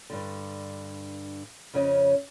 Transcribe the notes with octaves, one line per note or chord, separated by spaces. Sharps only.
G2 D3
F2 C#3 C#4 C#5 D#5